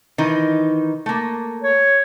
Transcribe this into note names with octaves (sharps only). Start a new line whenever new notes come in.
D#3 E3 D#4
A3 A#3
C#5